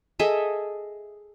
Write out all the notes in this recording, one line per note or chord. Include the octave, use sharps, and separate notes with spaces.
G#4 A4 D#5 E5